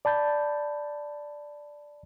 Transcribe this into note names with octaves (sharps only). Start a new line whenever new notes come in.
D5 A5 B5 G6 A6